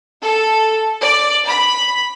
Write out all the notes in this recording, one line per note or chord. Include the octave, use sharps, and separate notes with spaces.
A4
D5
B5